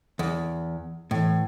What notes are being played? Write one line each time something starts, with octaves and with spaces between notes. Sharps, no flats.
E2
A2 E3